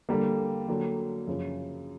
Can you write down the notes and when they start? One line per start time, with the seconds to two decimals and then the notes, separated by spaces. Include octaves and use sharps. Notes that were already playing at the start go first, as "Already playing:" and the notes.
0.09 D3 G3 A#3
0.68 D3 F#3 A#3 D4
1.27 F#2 C#3 F3